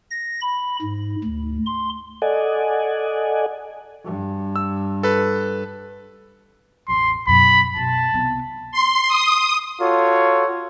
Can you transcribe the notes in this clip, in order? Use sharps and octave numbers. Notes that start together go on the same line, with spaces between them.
A#6
B5
G#2
D2
C6
A4 D5 D#5 F#5 G#5
G2
E6
A4 B4
A1 E2 C6
F#2 B2 B5
B2 A5
C2 B3
C6
D#6
F4 F#4 A4 C#5